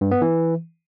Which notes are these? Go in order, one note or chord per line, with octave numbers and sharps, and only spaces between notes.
G2
B3
E3